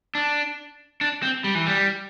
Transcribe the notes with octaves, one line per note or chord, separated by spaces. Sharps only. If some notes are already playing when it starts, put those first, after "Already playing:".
D4
D4
C4
G3
E3
G3